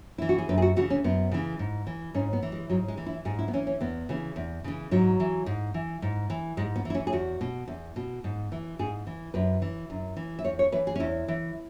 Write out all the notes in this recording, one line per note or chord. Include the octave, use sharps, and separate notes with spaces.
E3 E4
F#4
G#4
F#2 B4
G#4
F#4
C#3 E3 F#4
C#4
F#2 B3
C#3 E3
G#2
E3
G#2 C#4
B3
E3
G#3
G#2 F#3
G#3
E3
E4
G#2 G#4
E4
B3
E3 C#4
C#4
E2 B3
C#3 E3
E2
C#3 E3
G#2 F#3
E3
G#2
E3
G#2
E3
G#2 G#3
B3
E3
E4
C#4
G#4
E2 F#4
B2
E2
B2
G#2
E3
G#2 G#4
E3
F#2 B4
E3
F#2
E3
E5
E2 C#5
C#5
E3 B4
G#4
C#4
E2 E4
E3